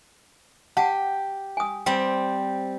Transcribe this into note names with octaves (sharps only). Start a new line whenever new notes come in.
G4 F#5 A5
G#5 D#6
G3 C4 G5